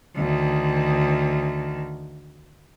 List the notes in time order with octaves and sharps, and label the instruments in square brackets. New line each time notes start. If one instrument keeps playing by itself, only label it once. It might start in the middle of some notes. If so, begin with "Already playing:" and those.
[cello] D2 D#3